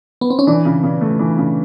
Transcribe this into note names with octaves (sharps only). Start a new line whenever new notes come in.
B3
C4
C#4
E3 D4
C#3
C#3
A3
E3
C#3